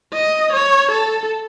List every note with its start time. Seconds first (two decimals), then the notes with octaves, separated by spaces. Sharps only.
0.13 D#5
0.53 C#5
0.91 A4